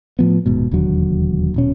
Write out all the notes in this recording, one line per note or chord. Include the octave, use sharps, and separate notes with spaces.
A2 F3 B3
D#1 G#2 B2
E1 D#2 D3 F#3
D#1 B2 C#4